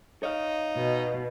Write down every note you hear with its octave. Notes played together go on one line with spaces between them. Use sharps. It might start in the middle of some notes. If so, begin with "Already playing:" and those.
D#4 C#5 F5
B2